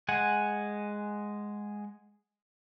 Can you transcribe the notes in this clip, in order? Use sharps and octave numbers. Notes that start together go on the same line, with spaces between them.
G#3 F#5 G#5